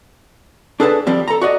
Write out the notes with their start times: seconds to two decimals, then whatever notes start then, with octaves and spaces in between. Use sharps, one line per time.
0.80 D4 G#4 A4 B4 E5 A5
1.07 F3 G3 C4
1.28 A4 A#5
1.41 F#4 D5 D#5